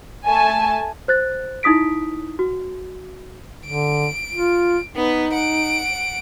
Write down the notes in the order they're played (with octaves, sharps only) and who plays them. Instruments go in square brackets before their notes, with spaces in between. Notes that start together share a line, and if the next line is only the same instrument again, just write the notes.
[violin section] A3 G#5 A5
[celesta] C5 F#6 A6
D#4 E4 D#6 B6 D7
F#4
[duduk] D3 [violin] D7
[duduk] F4
[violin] B3 B4 [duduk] D#4
[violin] F#5 D7